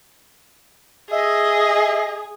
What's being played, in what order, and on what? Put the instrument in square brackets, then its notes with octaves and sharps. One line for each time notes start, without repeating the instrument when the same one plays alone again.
[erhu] G#4 [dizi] D#5 [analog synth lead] E5